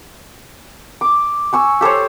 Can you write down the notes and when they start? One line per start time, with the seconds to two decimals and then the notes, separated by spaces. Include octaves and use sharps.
1.01 D6
1.53 G#5 C#6 E6
1.81 G4 A4 C5 C#5